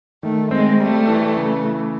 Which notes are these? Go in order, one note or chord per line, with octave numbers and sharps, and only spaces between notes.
D#3 A3
G#3 C4
G3 A3
E3
C#3
E3